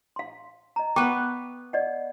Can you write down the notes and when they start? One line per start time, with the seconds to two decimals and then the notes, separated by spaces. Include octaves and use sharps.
0.16 F5 C6
0.76 D#5 A#5
0.96 B3 B4 G5 C#6 D6
1.73 D5 D#5 F#5